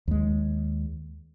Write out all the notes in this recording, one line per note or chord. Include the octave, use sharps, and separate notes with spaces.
D#2 G#3